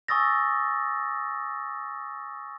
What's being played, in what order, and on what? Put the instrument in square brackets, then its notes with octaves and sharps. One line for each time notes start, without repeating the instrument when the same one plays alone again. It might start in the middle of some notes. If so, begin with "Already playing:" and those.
[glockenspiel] G#5 C#6 D#6 E6 A6 A#6